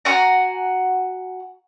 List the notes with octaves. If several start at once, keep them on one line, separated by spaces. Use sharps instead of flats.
F#4 F#5 G#5 A#5